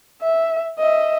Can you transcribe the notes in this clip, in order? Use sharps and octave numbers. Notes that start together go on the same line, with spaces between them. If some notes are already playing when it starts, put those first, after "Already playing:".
E5
D#5 E5